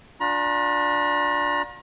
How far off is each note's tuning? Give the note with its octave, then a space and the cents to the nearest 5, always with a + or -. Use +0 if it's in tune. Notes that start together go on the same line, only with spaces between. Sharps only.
D4 +0 F4 +40 A#5 +40